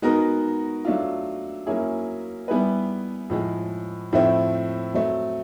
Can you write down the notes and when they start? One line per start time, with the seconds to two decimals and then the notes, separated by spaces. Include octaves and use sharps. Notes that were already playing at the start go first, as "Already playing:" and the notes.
0.02 G#3 B3 D#4 F#4 A#4
0.85 F#3 A3 D4 F4
1.67 F#3 A#3 C#4 E4 G#4
2.48 G3 B3 E4 G#4 B4
3.30 A2 F3 G#3
4.13 A2 F3 A3 C4 E4
4.94 F#3 A3 C4